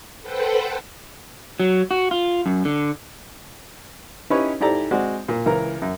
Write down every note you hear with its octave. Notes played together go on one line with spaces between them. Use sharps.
A4 B4 C5 F#5 G5
F#3
F#4
F4
F#2
D3
C#4 D#4 E4 G4 B4 C#5
G#2 E4 G4 A4 D5 A#5
G#3 C4 F#4 D5
A#2
C#2 E3 A#4 A#5
F#2